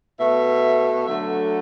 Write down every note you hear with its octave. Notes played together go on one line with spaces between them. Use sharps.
B2 A3 E5
D3 F#3 A3 E5